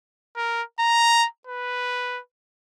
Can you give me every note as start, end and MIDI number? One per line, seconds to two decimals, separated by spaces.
0.36 0.62 70
0.79 1.25 82
1.47 2.20 71